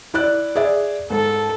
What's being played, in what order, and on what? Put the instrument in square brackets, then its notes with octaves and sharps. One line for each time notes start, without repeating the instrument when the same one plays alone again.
[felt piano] E4 D5 F#6
G#4 D5 E5
[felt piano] G#2 [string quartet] A4